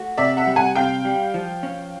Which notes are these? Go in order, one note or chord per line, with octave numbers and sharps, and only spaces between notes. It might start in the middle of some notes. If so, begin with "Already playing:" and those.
Already playing: A3 F#4
C3 D5 E5
E5 F#5
G3
F#5 G#5
C3 F5 G5
G3
F3
C#4